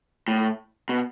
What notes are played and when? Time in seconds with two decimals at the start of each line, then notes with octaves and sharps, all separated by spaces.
0.28 A2
0.89 B2